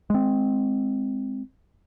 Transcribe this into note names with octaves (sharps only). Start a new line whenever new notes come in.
G#3 C4